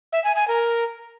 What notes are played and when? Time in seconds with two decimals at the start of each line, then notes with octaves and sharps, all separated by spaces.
0.13 E5
0.24 G#5
0.36 G#5
0.48 A#4